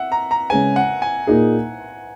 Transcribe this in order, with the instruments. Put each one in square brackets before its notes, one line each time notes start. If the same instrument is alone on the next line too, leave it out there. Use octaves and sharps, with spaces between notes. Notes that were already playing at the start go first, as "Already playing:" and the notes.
Already playing: [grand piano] E5 F#5
A#5
A#5
[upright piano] C#3 G#3 C#4 G#4 B4 [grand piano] G#5
[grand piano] F#5
G#5
[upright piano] A#2 A#3 D#4 G#4